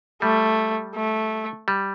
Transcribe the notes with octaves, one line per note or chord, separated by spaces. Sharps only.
G3 A3
A3
G3